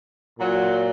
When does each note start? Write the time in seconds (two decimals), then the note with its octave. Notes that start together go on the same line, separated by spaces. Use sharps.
0.38 A#2 F#3